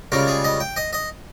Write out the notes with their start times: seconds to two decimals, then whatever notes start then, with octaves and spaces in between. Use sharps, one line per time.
0.12 C#2 C#3 G3 A#4
0.28 G#4
0.44 D#5
0.60 G5
0.76 D#5
0.93 D#5